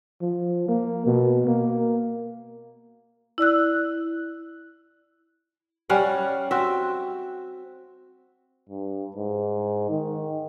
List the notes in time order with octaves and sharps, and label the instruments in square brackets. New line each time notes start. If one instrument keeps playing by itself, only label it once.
[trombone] F3
A#3
B2
A#3
[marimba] E4 D5 E6 F#6
[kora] G3 C#4 F5 F#5
C4 F#4 E5
[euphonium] G2
G#2
D#3